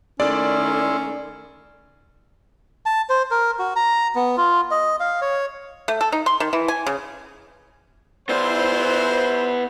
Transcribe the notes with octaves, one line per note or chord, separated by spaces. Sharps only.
D#3 A3 C#4 E4 D5 C6
A5
C5
A#4
F#4
A#5
B3
F4
D#5
F5
C#5
A3
A4
D#4
C6
D#3
E3
G#5
C#3
B3 E4 C5 D5